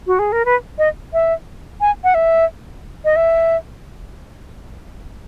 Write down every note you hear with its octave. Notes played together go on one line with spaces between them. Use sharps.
F#4
G#4
A#4
B4
D#5
E5
G#5
F#5
E5
D#5
E5